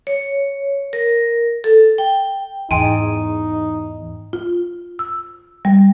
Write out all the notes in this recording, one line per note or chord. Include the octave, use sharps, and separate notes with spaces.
C#5
A#4
A4
G5
E2 G#2 D#4 G5 G#5 C6
F4
E6
G3